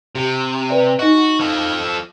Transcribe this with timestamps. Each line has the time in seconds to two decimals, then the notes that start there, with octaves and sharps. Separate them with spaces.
0.15 C3 G4
0.70 B4 D5
0.99 D#4 F#4 D#5
1.40 F3 A4